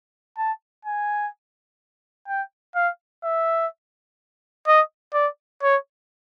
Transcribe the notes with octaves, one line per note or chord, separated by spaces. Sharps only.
A5
G#5
G5
F5
E5
D#5
D5
C#5